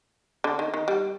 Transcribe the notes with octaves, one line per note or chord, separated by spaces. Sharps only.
D3
D#3
D#3
G3